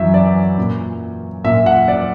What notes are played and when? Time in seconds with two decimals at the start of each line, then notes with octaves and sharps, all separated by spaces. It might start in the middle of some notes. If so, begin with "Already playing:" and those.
Already playing: F#2 E3 E5
0.14 D5
0.58 A#2
1.44 A#2 E5
1.66 F#5
1.88 D5